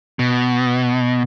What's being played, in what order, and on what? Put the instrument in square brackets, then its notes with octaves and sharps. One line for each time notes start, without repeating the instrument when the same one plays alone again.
[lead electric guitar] B2